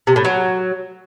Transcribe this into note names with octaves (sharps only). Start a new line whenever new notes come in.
C3
A2
F#3